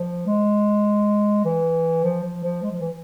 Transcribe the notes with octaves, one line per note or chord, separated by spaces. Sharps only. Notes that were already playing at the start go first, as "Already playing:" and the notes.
Already playing: F3
G#3
E3
F3
F3
F3
G#3
F3
E3